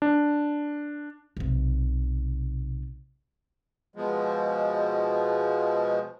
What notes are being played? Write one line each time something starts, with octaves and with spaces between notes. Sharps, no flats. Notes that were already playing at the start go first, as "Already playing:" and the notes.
D4
B1 C3
B2 F3 G#3